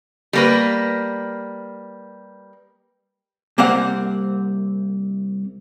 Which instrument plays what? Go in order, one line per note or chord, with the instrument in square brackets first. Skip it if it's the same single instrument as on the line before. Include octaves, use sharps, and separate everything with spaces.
[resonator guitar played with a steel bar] G3 A#3 B4
[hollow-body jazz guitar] C2 A#3 C4 F5 F#5